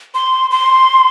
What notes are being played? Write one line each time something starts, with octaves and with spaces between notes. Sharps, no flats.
C6
C6